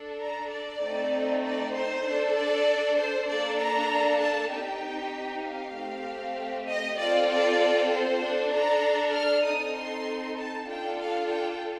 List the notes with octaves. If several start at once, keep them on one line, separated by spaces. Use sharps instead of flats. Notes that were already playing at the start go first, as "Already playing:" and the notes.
Already playing: D4 A4
A#5
D5
A3 C4 D#4 A4
D5
C5
D4 A4
D5
C5
A#3 D4 A4 D5
A#5
A5
C4 D#4 G4 G5
F5
A3 C4 G4
D#5
C4 F4 A4 D5
D5
C5
D4 A4
A#5
F6
C4 D#4 A4 D#6
C6
A5
D4 F4 A4 G5
F5
G5